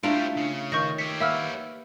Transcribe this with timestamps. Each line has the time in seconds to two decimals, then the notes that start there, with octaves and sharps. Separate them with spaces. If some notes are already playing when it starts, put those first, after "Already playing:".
0.03 G3 A3 D4 E4 F4 C5 A#5 D7
0.37 C#3
0.72 D#3 C#6 G6 A#6
0.98 G4 C#5 B6
1.20 A#3 B4 E5 F#5 E6 F6